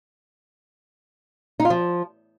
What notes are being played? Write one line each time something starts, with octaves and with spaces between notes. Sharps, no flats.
D#4
F4
F3